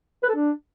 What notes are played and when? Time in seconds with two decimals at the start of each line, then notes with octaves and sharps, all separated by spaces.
0.23 B4
0.29 A4
0.35 D4